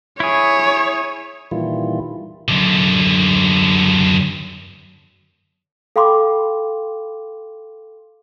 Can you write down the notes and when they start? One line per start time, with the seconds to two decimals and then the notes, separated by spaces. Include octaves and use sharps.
0.20 E4 G#4 C#5
1.51 A#2 D#3 E3 G3 E4 F4
2.48 F#2 D3
5.96 A4 F5 G5 B5 C6 D6